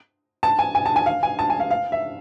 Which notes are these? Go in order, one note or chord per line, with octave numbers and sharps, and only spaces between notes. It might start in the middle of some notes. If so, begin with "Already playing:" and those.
A5
G#5
G#5
A5
G#5
F5
G#5
A5
G#5
F5
F5
E5